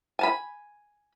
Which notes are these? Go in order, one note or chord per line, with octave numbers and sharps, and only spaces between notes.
G#5 A5 B5